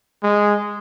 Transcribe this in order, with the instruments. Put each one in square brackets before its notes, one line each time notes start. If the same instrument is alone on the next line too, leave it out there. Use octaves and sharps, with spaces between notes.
[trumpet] G#3